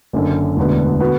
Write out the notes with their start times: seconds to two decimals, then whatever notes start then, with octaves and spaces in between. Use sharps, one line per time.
0.13 F#1 F#2 D3
0.57 E1 D2 D3 B3
1.00 D3 B3 F#4